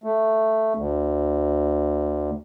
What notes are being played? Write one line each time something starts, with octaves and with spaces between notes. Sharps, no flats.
A3
D2